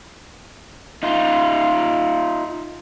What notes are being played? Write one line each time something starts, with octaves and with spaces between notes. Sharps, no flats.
D#4 F4